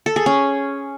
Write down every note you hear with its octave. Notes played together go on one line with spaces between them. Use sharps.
A4
G#4
C#4